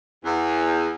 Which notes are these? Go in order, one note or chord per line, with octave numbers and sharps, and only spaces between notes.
E2